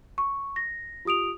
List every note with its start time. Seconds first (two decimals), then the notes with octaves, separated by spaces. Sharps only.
0.18 C#6
0.56 A#6
1.05 F4 G4 D#6 D7 F7